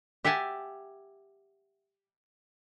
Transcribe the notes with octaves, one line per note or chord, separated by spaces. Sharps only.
G4 E5 F#5 G#5 A5